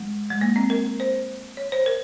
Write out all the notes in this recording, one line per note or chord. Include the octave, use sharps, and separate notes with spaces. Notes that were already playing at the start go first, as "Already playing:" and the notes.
Already playing: G#3
G#3
A#3
C4
A#4
C5
C#5
C5
A#4